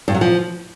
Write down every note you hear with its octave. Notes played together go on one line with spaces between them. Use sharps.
G2
F#3
F3